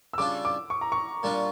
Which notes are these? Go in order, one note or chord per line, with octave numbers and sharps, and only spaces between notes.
E6
C#3 G3 D4 F4 D6
D6
C#6
A#5
C#6
A#2 G3 D4 F4